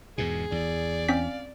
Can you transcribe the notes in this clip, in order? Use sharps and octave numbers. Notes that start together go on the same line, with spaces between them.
E2 G#2 B2 G#4
E2 D5
C4 C#4 F5 B6